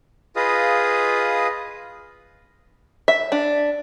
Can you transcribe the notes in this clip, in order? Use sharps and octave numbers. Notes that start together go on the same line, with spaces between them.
F4 G#4 B4 D#5 F5 D#6
E5
D4